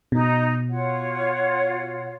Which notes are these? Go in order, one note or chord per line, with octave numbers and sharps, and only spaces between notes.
B2 D#4
F4 C#5 F#5